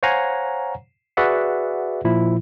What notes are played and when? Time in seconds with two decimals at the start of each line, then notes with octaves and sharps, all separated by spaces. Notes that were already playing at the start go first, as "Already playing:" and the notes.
0.03 C5 C#5 F5 F#5 G#5 A#5
1.17 F#4 G#4 B4 D5 E5 F#5
2.04 A#2 F3 E4